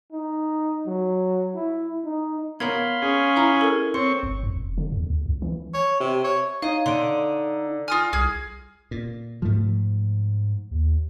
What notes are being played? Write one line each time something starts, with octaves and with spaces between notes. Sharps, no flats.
D#4
F#3
E4
D#4
B3 A#4 C#5 F5 B5 C6 G#6
C#4 G#4
E4 A#5
A4 A#4
C4 C#5 C6 C#6
G1
F2
E1
D3
E2
D2
C#2
E3
C#5
C3
C#5
D#4 C#5 D#5 F5
D3 C6 D7
F4 G#5 D#6 F6 A#6
C2 G#4 F6 G#6
A#2
G#2 F3 A3
D#2